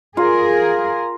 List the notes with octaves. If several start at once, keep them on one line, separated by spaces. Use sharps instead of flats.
F4 G#4 A#4